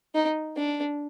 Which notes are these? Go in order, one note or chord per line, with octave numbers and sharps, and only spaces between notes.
D#4
D4